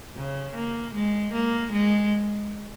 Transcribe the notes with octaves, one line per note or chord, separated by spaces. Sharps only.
C#3
A#3
G#3
A#3
G#3